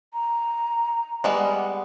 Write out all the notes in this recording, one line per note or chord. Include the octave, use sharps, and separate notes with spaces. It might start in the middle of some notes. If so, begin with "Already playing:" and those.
A#5
G3 G#3 B3 F#5